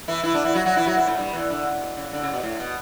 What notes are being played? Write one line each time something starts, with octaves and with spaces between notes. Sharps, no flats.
E3 E4
E3 E4
D3 D4
E3 E4
F#3 F#4
F#3 F#4
E3 E4
F#3 F#4
E3 E4
A2 A3
G2 G3
E2 E3
D3
C#3
B2
C#3
D3
C#3
B2
A2
B2